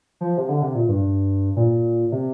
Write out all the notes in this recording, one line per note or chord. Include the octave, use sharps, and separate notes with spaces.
F3
C3
D3
C3
A#2
G2
A#2
C3